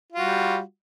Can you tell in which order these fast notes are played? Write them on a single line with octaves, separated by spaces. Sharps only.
F4 F#4 G3